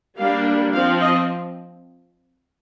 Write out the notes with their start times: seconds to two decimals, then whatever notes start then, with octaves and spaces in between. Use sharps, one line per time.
0.17 G3 A#3 D4 F5
0.72 F3 C4 F5
1.00 D#5